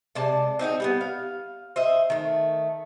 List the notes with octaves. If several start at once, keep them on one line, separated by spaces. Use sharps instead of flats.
C3 G#3 D5 A5
C4 D#4 F#4 G#4
G3 A#3 B3
F5
C5 D#5 E5
D#3 A3